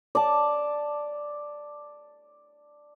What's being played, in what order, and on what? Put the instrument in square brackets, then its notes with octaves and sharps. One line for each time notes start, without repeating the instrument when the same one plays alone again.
[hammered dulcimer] D5 A5